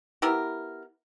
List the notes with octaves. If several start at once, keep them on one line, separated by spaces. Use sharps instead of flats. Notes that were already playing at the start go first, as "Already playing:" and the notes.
B3 E4 G4 A#4